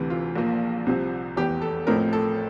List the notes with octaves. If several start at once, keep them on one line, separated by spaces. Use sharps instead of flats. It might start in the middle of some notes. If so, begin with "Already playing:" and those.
Already playing: D2 C3 E3
F4
A#1 A#2 F3 A#3
C2 C3 F3 C4
F1 E2 E3 G4
A4
A1 A2 F3 A3 C4 A#4
A4